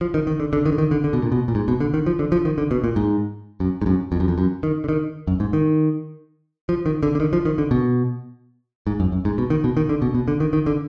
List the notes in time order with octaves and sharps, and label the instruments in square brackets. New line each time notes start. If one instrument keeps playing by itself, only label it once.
[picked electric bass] F3
D#3
D#3
D3
D3
D#3
D3
D#3
D3
D3
B2
A#2
B2
A#2
G#2
B2
D3
D#3
F3
D3
F3
D#3
D3
B2
A#2
G#2
F#2
G#2
F#2
F2
F#2
F2
F#2
D#3
D3
D#3
F#2
G#2
D#3
F3
D#3
D3
D3
D#3
F3
D#3
D3
B2
G#2
F#2
F#2
G#2
B2
D#3
B2
D#3
D3
B2
B2
D3
D#3
D#3
D3